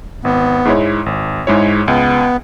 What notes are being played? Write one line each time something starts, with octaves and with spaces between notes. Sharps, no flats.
G#1 B3
G#2 G#3 E4 C#5
G#1
G#2 G#3 E4 C#5
C#2 B3